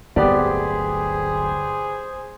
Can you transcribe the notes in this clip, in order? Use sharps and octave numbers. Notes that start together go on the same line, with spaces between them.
D1 G1 A3 B3 G4 G#4 C5 D5